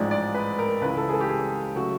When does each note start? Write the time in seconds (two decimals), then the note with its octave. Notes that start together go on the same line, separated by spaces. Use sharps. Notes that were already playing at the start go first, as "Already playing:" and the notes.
Already playing: A1 G#2 F3 G#3 D5
0.11 D5
0.34 B4
0.59 A#4
0.81 C#2 C#3 E3 G#3 B4
0.97 A4
1.09 G#4
1.13 A4
1.21 G4
1.29 G#4
1.75 C#3 F#3 A3 F#4